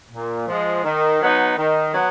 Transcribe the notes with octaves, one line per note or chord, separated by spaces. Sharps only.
A#2
F3 G#3
D#3
F#3 B3 D#4
D#3
F#3 B3